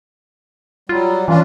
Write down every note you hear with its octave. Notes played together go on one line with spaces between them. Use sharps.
F#3 G3 F4
E3 C#4 D4 F4